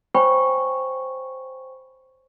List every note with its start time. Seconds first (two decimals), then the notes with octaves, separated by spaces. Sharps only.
0.15 C5 C#5 G5 G#5 B5 C#6